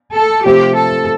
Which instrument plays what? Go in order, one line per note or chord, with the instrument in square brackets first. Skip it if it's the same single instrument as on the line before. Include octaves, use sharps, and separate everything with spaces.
[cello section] A4
[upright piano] C3 F3 A3 C4 [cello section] G4
[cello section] A4